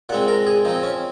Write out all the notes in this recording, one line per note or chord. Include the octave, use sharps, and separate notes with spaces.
A#2 G#3 C4 F#5
A#4
G#4
F3 C4 D#4
C#4